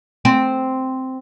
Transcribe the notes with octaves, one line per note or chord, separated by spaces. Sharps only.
C4